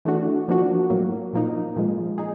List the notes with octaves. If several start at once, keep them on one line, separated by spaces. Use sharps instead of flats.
E3 A3 D4 F#4
F3 A#3 D4 F#4
A2 F#3 A#3
A#2 F3 A#3 D#4
A#2 F3 G#3
D#4 G#4